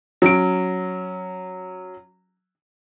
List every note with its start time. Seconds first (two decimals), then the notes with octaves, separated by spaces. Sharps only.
0.22 F#3 C#4 D7